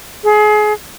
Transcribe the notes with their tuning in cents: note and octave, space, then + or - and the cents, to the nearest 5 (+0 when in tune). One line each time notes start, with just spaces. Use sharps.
G#4 +30